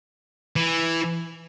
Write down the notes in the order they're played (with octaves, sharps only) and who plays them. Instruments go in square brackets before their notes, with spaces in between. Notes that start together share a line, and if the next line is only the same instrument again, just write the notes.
[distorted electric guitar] E3